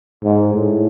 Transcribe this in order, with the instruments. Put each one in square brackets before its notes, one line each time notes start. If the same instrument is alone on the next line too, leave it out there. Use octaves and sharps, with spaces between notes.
[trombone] G#2
A2